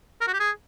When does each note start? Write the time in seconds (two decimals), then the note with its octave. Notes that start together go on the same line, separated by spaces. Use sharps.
0.21 A#4
0.27 F#4
0.34 G4
0.40 G#4